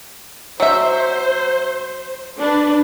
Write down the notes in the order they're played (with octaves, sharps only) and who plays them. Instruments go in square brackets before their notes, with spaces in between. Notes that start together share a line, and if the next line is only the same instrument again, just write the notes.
[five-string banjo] F#3 E5 [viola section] C5
[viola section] D4 B4